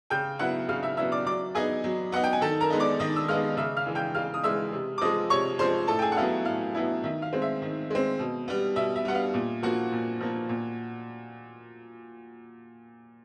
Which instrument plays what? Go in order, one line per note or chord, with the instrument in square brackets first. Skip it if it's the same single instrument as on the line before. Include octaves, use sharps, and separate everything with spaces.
[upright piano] C#3 G5 G6
F#3 B3 E4 F#5 F#6
C#3 F5 F6
E5 E6
F#3 B3 E4 E5 E6
D5 D6
F#3 D5 D6
B3 D#4 G#4 G#5
F#3
B3 D#4 F#5
G5
G#5
D#3 A4 A5
A#4 A#5
G#3 B3 D#4
D5 D6
D#3 D#5 D#6
E6
G#3 B3 D#4 F5 F6
C#3 E5 E6
F5 F6
E3 G#3
G5 G6
C#3 F5 F6
D#6
E3 G#3 E5 E6
C3
D6
F3 G#3 D#5 D#6
C3 C#5 C#6
F3 G#3 C5 C6
A2 A4 A5
G5
G#4 G#5
F#5
F#3 B3 E4 F5
A2 F5
F#3 B3 E4
D#3 E5
F5
G#3 C4
E5
D#3
G#3 C4
B2
G3 B3
B2 E5
E5
G3 B3 F#5
F5
A#2
F3 A#3 F#4 F#5
A#2
F3 A#3
A#2